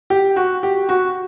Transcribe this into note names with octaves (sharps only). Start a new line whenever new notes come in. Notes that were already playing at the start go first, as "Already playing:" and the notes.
G4
F#4
G4
F#4